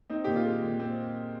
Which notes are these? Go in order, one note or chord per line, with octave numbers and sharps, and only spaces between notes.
C4 D#4
A#2 G4
F4
G#3
A#2
C4